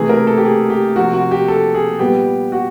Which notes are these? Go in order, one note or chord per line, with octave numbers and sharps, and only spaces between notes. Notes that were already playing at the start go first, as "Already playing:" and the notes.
Already playing: C3 E3 A3 G#4
A#4
A4
G4
G#4
G4
C3 F3 A#3 F#4
F#4
G4
A4
G#4
A#2 G3 B3 G4
F#4